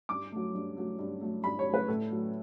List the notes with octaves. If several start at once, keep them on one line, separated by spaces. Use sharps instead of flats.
G2 D6
F#3 A3
G2
F#3 A3
G2
F#3 A3
G2 B5
C#5
F#3 A3
B4
A2 A4
F#3 A3